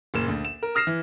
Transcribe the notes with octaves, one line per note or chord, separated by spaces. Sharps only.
F#1 A#2 E7
D2
E7
A#4
D#6 F6 A#6 C7 E7
E3